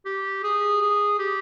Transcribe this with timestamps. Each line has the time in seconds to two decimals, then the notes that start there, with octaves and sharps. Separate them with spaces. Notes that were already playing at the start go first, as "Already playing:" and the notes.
0.06 G4
0.43 G#4
0.81 G#4
1.19 G4